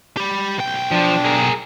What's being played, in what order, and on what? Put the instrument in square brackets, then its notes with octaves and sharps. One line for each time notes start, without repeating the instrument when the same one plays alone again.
[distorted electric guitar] G4 B5
B1 G5
[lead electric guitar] F3 [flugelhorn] D4
[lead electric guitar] G#4 A#4